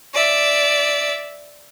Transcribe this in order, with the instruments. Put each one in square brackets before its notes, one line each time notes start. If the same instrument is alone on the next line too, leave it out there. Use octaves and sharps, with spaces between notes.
[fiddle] D5 E5